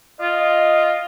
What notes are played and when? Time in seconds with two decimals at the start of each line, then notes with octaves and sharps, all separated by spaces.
0.21 F4 D#5